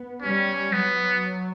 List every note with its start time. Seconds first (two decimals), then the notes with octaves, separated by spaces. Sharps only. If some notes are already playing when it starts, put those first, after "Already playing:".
Already playing: B3
0.22 G3 C#4
0.73 F#3 B3